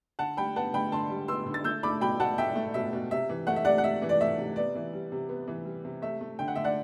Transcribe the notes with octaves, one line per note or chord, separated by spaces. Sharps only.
D3 F#5 A5
G3 G5 B5
B3 F#5 A5
D3 G5 B5
D3 A5 C6
G3
B3 C6 E6
D3
A6
A3 E6 G6
A3 B5 D6
B2 G5 B5
B2 F#5 A5
A3 E5 G5
A3
B2 E5
B2
C3 E5
E3
A3 F#5
E5
C3 D5 F#5
F#5
C3 E5
E3
D5
A3 E5
C3
B3 D5
E3
G3
C3
B3
E3
G3
C3
A3 E5
A3
D3 G5
F#5
D3 E5
D5 F#5